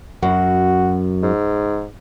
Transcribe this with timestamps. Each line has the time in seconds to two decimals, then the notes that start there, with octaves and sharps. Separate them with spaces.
0.23 F#2 F#4
1.23 G#2